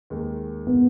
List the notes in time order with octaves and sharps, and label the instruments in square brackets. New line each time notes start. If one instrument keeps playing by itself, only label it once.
[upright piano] D#2 D#3 G#3
[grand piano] B3